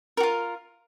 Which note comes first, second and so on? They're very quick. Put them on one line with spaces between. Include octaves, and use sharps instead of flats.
A#4 F#4 F4